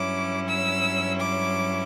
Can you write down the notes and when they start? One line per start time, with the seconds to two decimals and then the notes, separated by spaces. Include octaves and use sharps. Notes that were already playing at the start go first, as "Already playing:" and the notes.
Already playing: G2 F#3 C#4 E4 D6
0.48 E6
1.21 D6